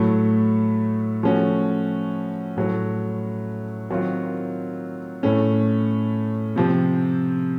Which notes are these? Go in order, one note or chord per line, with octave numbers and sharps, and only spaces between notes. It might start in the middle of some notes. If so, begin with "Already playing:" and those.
Already playing: A2 F#3 A3
F3 A3 C#4 F#4
A2 F#3 A3
D#3 F#3 C4 F4
A2 A3 C#4
C3 F3 C4